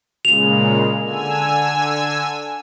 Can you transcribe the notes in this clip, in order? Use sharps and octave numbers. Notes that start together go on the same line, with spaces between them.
A#2 C#3 G#3 F7
D3 G#5 E6